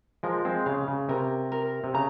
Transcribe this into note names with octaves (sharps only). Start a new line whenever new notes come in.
F3 G#3 A#4
G#3 C4
C#3 F5
C#3
C3 A#4
A#4
C3
C#3 A#5